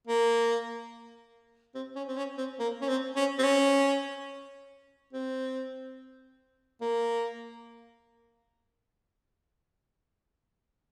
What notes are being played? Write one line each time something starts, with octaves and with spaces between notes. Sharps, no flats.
A#3
C4
C#4
C4
C#4
C4
A#3
C#4
C4
C#4
C4
C#4
C4
A#3